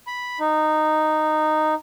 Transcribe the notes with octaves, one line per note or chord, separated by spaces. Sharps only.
B5
D#4